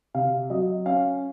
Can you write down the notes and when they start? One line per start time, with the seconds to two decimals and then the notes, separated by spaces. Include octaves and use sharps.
0.14 C3 F5
0.50 F#3 D#5
0.86 C#4 F5